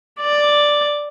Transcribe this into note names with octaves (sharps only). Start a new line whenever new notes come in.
D5